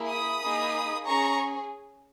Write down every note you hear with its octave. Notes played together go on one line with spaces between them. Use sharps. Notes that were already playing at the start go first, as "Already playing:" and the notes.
Already playing: A#3 E4 G#4
B5 D#6
A#3 D#4 G#4
C#4 G#4 A#5 C#6